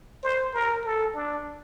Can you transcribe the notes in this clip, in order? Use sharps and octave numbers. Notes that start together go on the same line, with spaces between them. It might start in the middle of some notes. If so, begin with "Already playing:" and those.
C5
A#4
A4
D4